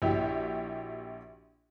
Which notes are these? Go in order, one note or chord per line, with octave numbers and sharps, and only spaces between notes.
A#1 E4 F#4 G4